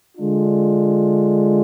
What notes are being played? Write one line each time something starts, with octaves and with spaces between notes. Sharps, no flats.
D3 G#3 D4 F4